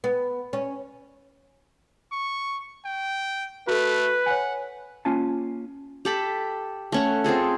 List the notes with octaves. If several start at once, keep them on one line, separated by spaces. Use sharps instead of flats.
B3
C#4
C#6
G5
A3 F#4 A4 B4
C#5 F#5 G#5
A#3 C#4 F4 G#5 A5
G4 A4 B5
A3 C#4 F#5
C4 F4 G#4 A4